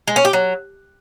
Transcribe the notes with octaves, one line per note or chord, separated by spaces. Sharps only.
G#3
C#4
G4
F#3